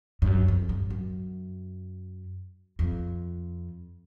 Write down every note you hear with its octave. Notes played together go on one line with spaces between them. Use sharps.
G2
F#2
F2
G2
F#2
F2